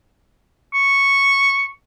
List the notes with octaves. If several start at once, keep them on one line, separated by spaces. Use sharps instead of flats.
C#6